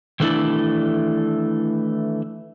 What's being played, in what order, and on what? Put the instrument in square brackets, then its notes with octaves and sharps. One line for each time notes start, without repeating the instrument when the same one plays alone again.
[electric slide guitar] D#3 E3 A3 D4 E4 A4